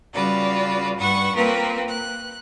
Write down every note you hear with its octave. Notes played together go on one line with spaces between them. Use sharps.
C#3 G3 F4 F#4 B4 D5
G2 B4 F#5 C#6 E6
A#3 C4 F4 A#4 B4
F#6